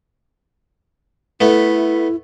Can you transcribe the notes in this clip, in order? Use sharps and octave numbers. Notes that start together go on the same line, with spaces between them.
A3 B3 E4